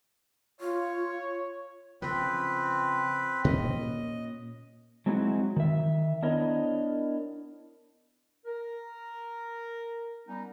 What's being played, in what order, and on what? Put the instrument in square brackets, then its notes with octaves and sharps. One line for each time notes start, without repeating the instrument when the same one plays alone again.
[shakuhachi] F4 [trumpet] C#5
[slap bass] C#3 F3 [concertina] C4 B4
[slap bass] A#2 C#4 [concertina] D#5
[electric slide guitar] F#3 G#3 C4 D#4 E4 F#4
D#3 E5
B3 D4 E4 A#4 C#5 D#5
[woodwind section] A#4
G3 B3 C#4 D#4